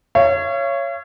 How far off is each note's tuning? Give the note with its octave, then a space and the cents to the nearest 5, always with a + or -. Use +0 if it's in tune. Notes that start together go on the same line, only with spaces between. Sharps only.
C#5 +0 F5 -45